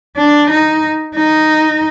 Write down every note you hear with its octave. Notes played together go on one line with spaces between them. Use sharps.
D4
D#4
D#4